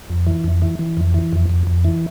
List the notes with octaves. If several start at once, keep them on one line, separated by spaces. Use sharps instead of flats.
F2
E3
F2
E3
E3
F2
E3
F2
F2
F2
E3